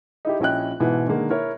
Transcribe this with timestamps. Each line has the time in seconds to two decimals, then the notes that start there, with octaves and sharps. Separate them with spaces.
0.25 D#4 E4 G4
0.40 A#1 C#4 E4 D#5 G5 F#6
0.80 G#2 B2 E3 E4
1.06 D3 D#3 G#3 A#3
1.30 E4 A#4 C#5